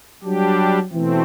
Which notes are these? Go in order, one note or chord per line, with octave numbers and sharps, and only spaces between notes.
F#3 G3 D4 G4
B2 E3 A3 C4